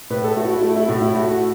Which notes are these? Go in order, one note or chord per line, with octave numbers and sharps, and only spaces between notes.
A2 B4
A4
A3 F#4
E4
F#4
A3 E4
E4
A2 F#4
E4
A3 F#4
F#4